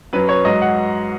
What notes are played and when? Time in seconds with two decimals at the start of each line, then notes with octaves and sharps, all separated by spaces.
0.13 F#2 F#3 B4
0.29 C#5
0.45 G#2 F#3 D#5
0.62 F#5